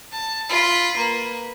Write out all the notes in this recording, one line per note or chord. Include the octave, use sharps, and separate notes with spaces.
A5
F4 B5
A#3 B4